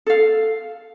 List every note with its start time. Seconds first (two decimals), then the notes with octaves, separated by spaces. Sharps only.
0.06 A4 F5